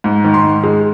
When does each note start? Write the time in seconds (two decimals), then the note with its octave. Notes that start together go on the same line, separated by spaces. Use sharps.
0.04 G#2
0.24 D#3
0.34 C6
0.44 G#2
0.64 G#3